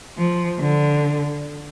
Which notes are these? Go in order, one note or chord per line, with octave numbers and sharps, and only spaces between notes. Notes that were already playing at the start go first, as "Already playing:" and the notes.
F3
D3